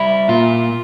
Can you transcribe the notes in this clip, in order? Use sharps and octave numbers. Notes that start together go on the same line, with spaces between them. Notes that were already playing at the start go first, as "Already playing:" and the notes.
Already playing: G3 E4
A#2 F4